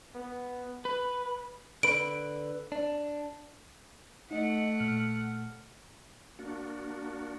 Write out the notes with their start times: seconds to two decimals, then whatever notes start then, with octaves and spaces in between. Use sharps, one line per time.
0.15 B3
0.85 B4
1.83 D3 B4 D7
2.72 D4
4.31 A3 D#4 D#5 F#5
4.80 A#2 F6
6.39 A#3 D4 F#4